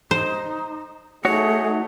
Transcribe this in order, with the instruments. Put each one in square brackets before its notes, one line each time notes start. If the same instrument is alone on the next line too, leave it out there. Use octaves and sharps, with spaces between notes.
[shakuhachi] D#4 [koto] C5
[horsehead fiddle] A3 D#4 [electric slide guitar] F#4 C#5 [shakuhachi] G#4